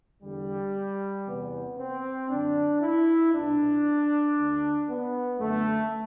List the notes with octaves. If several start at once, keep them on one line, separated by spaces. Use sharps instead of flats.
E2 D3 G3
E2 C3 E3 B3
C4
F#2 D3 D4
E4
C2 B2 D4
D2 D3
B3
F#2 D3 A3